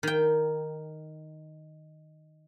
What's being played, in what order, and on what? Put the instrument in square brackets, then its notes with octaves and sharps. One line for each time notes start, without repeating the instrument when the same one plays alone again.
[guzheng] D#3 G5